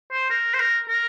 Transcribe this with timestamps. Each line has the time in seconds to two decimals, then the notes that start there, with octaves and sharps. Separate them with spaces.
0.12 C5
0.30 A#4
0.54 C5
0.60 A#4
0.89 A#4